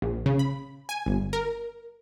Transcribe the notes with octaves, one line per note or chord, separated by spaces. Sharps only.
A#1
C#3
B5
G#5
G1
A#4